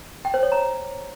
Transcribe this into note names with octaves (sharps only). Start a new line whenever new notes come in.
G5
C5
C#5
A#5